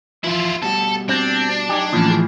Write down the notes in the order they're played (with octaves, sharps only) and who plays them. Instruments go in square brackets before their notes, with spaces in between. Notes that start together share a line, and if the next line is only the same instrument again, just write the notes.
[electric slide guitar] E3 F3 [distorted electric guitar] E4 F4
[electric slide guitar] B2 G3 F#4 [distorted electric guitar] A4
[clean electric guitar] C4 [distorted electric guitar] D4
[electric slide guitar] F#2 D#4 G#5 [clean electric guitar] G4
[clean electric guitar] A2 E3 F3 [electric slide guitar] A#3 C#4
[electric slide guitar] D#3 E4 G#4